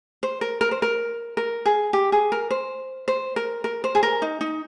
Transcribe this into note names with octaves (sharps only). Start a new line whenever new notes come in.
C5
A#4
A#4
C5
A#4
A#4
G#4
G4
G#4
A#4
C5
C5
A#4
A#4
C5
G#4
A#4
D#4
D#4